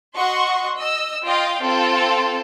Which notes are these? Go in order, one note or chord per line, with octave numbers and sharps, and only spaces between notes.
F#4 D#5 F#5 C6 C#6
D#5 E6
F4 D#5 F5 G5
C4 F4 A4